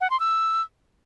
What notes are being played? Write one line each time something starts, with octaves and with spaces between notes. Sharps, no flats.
F#5
C6
E6